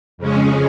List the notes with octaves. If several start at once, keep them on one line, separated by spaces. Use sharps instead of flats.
F2 C#3 G#3 C#4